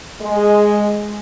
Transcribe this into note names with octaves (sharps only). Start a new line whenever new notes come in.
G#3